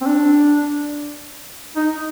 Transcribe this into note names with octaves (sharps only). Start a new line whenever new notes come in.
C4
D4
D#4